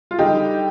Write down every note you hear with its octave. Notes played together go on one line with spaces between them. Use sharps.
F4
D3 G3 D#4 G4